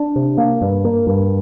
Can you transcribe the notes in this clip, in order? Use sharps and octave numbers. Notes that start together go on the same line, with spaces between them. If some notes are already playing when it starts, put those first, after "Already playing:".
Already playing: D4
C3
A#3
G2
A#3
G2